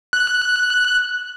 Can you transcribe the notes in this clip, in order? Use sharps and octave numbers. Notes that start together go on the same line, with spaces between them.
F#6